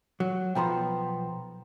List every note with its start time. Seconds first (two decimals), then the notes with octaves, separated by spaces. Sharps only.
0.20 F#3
0.55 B1 F3 B3 G5 A#5 C6